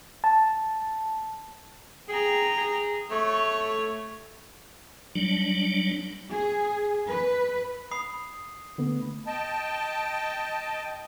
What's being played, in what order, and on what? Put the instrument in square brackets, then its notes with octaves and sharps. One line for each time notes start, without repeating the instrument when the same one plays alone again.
[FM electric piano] A5
[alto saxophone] G#4 [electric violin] G5 A#5
[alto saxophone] G#4
[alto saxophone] A3 [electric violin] C#5
[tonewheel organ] F#3 G3 D4
[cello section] G#4
B4
[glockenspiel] B5 D#6 C7
[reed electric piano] D3 A3 B3
[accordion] D#5 G5 A5